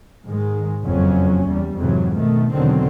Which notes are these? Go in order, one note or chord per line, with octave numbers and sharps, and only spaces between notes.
G#2 D#3 G#3
F#1 F2 F#3 C#4
E2 G3
F2 G#2 C3 E3 F#3
B2 D#3 A3
E2 B2 D3 D#3 F#3 C4